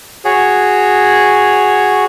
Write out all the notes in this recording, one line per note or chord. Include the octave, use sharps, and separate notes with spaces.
F#4 G#4 C#5